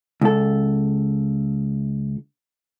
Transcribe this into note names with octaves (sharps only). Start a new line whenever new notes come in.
C#2 A4